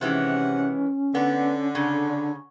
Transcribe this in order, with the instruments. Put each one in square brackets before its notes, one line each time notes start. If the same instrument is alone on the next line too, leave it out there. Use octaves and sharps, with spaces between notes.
[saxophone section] C3 F#5 [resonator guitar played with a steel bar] D#3 E3 G#3 [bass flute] C#4
[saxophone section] D3 [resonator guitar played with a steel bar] B3
[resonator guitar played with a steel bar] C#3 [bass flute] D4